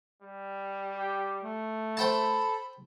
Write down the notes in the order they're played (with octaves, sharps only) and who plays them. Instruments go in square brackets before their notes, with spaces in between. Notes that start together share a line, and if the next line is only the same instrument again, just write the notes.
[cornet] G3
[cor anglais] G4
A3
[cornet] A4 [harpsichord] C5 G5 A5 [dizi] B5